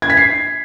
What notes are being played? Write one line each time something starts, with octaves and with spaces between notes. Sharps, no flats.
G#6
B6
C7